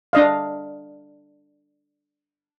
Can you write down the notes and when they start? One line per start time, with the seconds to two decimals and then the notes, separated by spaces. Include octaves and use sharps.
0.13 D4 D#5 F5